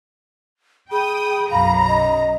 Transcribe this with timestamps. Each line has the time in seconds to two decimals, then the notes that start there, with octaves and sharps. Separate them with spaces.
0.91 G#4 G5 B5 D#6
1.51 B1 F#2 F5 A#5
1.88 D#5